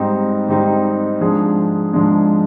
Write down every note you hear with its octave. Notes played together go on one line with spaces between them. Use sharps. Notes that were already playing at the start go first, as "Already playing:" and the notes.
Already playing: G#2 G3 C4 D#4
G#2 G3 C4 D#4
G#2 F3 G#3 D4 G#4
G#2 F3 G#3 D4 G#4